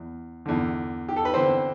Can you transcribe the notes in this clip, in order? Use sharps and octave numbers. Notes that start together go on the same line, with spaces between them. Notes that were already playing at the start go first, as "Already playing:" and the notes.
Already playing: E2
E2 D3
G4
A4
B4
E2 D3 C4 C5